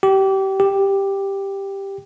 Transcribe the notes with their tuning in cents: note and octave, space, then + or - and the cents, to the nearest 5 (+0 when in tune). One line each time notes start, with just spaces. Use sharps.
G4 -25
G4 +5